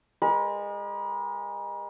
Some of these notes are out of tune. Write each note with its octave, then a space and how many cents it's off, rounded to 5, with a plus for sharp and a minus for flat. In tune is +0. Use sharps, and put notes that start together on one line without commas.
G#3 -30 A#4 +45